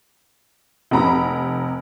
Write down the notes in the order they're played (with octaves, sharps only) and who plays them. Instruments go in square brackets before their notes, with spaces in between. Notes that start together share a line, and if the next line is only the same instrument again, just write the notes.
[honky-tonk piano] F1 C3 A#5 B5